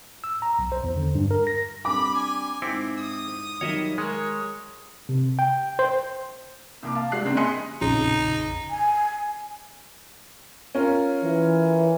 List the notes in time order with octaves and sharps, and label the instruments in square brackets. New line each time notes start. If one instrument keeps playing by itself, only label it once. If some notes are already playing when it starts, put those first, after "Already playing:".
[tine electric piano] E6
A#5
B1
C5
E2
D3
G2
A#4
A#6
[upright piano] G3 C4 D4 [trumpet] B5 [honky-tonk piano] D6
[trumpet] G#5
[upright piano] G#2 B6 C#7 [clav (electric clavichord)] C4 E4 G5
[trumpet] D#6
[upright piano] D#3 F#3 G3 [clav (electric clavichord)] C#5 D#5 E5
[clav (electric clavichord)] G#3 [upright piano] A#4 [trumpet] C#5
[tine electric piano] C3
G5
C5
[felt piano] C2 A#3 D6
F5 A5
G3 G#3 F#4 D5 F#6 C7
C#3 G#3 A#3 C4 D4
D#5 G#5 C6 F#6 B6 C#7
[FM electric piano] A#1 F2 C#3 [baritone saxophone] D#4
[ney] G#5
[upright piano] C#4 F4 A#4
[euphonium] E3